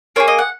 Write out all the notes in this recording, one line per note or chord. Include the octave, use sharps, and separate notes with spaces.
A#3 E4 G#4 C#5
D#5
F#5